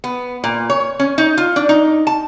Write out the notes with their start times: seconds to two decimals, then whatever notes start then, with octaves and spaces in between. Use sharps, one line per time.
0.04 B3
0.44 A#2
0.70 C#5
0.99 C#4
1.18 D#4
1.37 F4
1.56 D4
1.69 D#4
2.07 A5